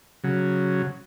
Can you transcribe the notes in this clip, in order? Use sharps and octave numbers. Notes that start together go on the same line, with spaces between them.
C#3 F#3